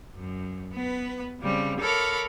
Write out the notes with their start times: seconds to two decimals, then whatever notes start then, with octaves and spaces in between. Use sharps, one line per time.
0.15 F#2
0.74 B3 B4
1.41 C#3 G3 C4
1.80 A4 A#4 C#5 F5 B5 D6